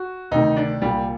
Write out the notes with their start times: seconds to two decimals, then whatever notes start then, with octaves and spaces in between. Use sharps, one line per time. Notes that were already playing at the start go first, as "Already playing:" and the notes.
Already playing: F#4
0.31 D2 C3 D#3 D#4
0.57 D4
0.82 C2 A#2 G3